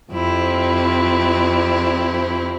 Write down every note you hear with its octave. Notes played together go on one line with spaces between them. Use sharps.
F2 C3 C4 E4